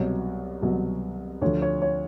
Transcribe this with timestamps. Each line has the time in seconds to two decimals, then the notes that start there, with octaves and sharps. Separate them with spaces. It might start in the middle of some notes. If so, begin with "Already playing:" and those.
Already playing: C2 B2 F#3 C#5
0.62 C2 B2 F#3
1.42 D2 D3 F3 C#5
1.62 C#5
1.82 C#5